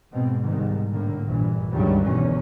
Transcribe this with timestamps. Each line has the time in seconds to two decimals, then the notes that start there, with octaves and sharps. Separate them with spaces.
0.11 G#2 B2 C4
0.42 C2 G#2 B2 D#3
0.92 A2 D3 A#3
1.25 A#1 G2 E3
1.71 C#2 G2 D3 D#3 F#3 G3
2.04 G1 E2 B2 D#3 C#4